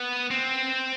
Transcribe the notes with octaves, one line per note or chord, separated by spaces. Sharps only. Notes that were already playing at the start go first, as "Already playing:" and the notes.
Already playing: B3
C4